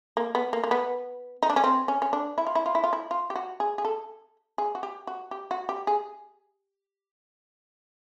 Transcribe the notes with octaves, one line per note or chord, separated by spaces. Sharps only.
A#3
B3
A#3
A#3
B3
D#4
D4
C#4
C4
C#4
C#4
D4
E4
F4
E4
F4
E4
F4
E4
F4
G4
F#4
G#4
G#4
A4
G#4
F#4
G4
F#4
G4
F#4
G4
G#4